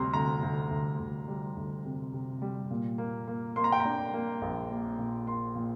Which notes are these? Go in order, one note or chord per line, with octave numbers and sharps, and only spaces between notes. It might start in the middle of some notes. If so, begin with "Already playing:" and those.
Already playing: D2 C3 G3 A#5 C6
D2 A#5
D2
D2
D2
G3
D2
C3
C3
G3
A#2
A#3
A#3
A#3 C6
A#5
G5
D4 A#5
A#3
A#1
A#3
A#2
A#3 C6
A#2